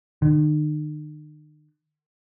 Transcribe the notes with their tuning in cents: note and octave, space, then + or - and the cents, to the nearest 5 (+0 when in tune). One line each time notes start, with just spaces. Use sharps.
D#3 -45